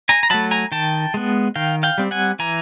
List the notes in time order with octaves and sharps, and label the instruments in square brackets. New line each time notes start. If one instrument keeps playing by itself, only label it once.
[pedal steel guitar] G#5 A#5
A#5
F#3 A3 A5 B5
G#5 A#5
D#3 G5 A5
G#3 B3
D#3 F5 G5
F5 G5
G3 C4
F#5 G#5
E3 G#5 A#5